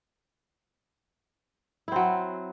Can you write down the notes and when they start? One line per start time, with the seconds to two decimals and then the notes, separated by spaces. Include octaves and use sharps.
1.88 E4
1.92 C4
1.96 F#3